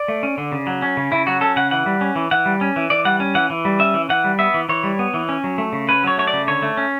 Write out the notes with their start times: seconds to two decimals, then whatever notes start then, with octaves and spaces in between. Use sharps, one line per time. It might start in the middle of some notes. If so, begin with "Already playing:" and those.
Already playing: D5
0.08 A3
0.23 C#4
0.38 D3
0.52 C#3
0.67 F#3
0.82 C#4
0.97 C#3
1.12 C#3 E4
1.27 F#3 F#4
1.41 C#4 A4
1.56 C#3 F#5
1.71 E3 F#5
1.86 G3
2.01 C#4
2.16 E3
2.31 E3 F#5
2.46 G3
2.61 C#4
2.76 E3
2.90 E3 D5
3.05 G3 F#5
3.20 C#4
3.35 E3 F#5
3.50 E3
3.65 G3
3.79 C#4 E5
3.94 E3
4.09 E3 F#5
4.24 G3
4.39 B3 E5
4.54 E3
4.69 E3 C#5
4.84 G3
4.99 B3
5.14 E3
5.29 C#4
5.44 F#3
5.58 A3
5.73 C#3
5.89 C#4 B4
6.03 F#3 C#5
6.17 A3 C#5
6.27 D5
6.33 C#3
6.47 D3 C#5
6.62 A3
6.77 C#4